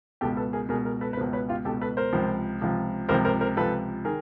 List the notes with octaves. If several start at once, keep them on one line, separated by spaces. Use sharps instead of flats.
C#2 B2 G4 A4
A4 B4
G#4 A#4
C#2 B2 G#4 A#4
G#4 A#4
A4 B4
B4
C#2 B2 A#4 C5
B4 C#5
F4 G4
C#2 B2 G4 A4
A4 B4
A#4 C5
C#2 C3 F3
C#2 C3 F3
C#2 C3 F3 A#4 C5
A#4 C5
A#4 C5
C#2 C3 F3 A4 B4
D#3 G#4 A#4